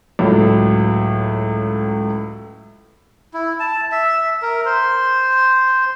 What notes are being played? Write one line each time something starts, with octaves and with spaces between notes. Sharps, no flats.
C#2 A2 F#3
E4
A5
E5
A#4
C5